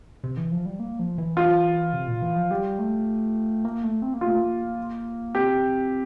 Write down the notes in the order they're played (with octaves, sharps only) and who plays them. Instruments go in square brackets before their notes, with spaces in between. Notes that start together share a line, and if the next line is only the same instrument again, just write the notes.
[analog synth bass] C3
E3
F3
G3
A#3
F3
E3
[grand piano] F4
[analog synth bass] C3
A#2
E3
F3
[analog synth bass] G3 [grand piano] G4
[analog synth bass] A3
A#3
A3
C4
A#3
[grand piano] F4
[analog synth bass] A3
A#3
[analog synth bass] C4 [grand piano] G4